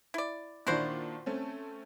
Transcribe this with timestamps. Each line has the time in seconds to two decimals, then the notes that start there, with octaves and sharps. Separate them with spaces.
0.14 E4 D5
0.67 A#2 D#3 D4 E4 F#4 C5
1.26 A3 C4 C#4